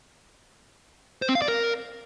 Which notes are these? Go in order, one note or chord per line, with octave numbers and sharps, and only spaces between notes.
C5
C4
F5
D5
A#4